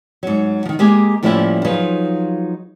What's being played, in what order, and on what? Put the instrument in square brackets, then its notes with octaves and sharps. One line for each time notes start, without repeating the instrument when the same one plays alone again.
[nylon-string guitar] G#2 F#3
D#3 F3
G#3 A#3 G4 G#4 D#5 G#5
A2 F3 G3 A#3 C#4 E4
F3 F#3 D#4 F4 G#4 B4